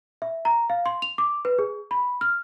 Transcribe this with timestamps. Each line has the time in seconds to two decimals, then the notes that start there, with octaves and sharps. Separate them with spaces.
0.22 E5
0.45 A#5
0.70 F5
0.86 C6
1.02 F7
1.18 D6
1.45 B4
1.59 G#4
1.91 B5
2.21 F6